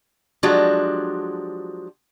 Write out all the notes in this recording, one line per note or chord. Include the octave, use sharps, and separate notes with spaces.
F3 F#3 G#3 D4 F#4 G4